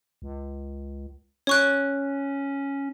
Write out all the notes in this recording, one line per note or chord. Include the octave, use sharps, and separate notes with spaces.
C#2
C#4 C#5 C#6 F#6